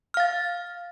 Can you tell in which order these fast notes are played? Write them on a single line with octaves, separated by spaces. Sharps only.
F6 F5 A6